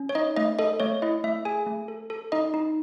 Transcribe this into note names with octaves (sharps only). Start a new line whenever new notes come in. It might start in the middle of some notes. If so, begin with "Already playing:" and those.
Already playing: C#4
C#5
D#4 D#5
A3 D#5
A4 D#5
A3 C#5
E4 D#5
A3 E5
G#4 G#5
A3
A4
A4
D#4 D#5
D#4